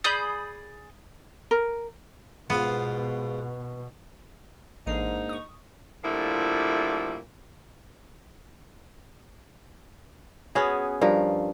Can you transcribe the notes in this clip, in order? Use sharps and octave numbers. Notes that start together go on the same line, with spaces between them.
G#4 D5 B5 D#6 G6
A#4
G#2 B2 B3 F4 F5
A1 G#2 A#3 D4 D#4 A#4 C7
C#6 D#6
A#2 D3 F3 G3 A3 E4
B3 C#4 F#4 G#4
G2 F3 A#4